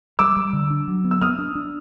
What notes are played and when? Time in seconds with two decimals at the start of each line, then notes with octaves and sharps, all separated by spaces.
0.19 G3 D6 E6
0.37 G3
0.53 D3
0.70 D4
0.88 F#3
1.04 B3
1.11 E6
1.21 B3 D#6 F6
1.39 D4
1.55 D4